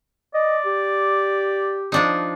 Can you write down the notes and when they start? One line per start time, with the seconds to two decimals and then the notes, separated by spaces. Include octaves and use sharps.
0.34 D5 D#5
0.66 G4
1.92 F3 D4 D#4